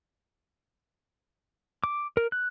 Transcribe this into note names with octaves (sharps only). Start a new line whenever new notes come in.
D6
A#4
F#6